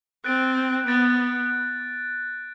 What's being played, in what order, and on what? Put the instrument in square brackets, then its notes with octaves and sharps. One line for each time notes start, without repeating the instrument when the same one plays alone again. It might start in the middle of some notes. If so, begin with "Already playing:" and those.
[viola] C4 [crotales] F#6 A6 D7
[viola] B3 [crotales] F#6 A6 D7